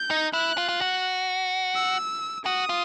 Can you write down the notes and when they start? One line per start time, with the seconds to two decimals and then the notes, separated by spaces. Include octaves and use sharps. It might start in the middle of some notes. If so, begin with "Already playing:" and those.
Already playing: G6
0.10 D#4
0.33 E4 F#6
0.58 F4
0.69 F4
0.81 F#4
1.75 E6
2.45 F#4 D#6
2.69 F4